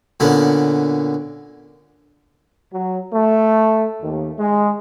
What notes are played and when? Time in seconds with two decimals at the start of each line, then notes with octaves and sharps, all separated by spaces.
0.20 A#2 D3 B3 C#4
2.72 F#3
3.13 A3
4.02 D#2
4.38 G#3